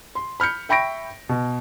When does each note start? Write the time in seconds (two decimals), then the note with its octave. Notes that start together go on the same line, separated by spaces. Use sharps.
0.15 C6
0.40 B5 F6 G6 C#7
0.69 E5 G5 B5 C#6 A#6 D7
1.29 B2